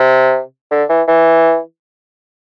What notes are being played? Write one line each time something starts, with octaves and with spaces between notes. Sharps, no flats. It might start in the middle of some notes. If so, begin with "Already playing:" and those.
Already playing: C3
D3
E3
E3